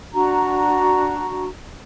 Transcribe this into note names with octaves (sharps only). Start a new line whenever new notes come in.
D4 F#4 A#5